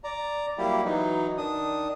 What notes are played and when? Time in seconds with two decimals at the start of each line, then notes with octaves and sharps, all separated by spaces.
0.04 D5 A#5
0.58 F#3 G3 A#3 E4 G4
0.85 E3 F#3 D#4
1.37 D#3 D4 D#6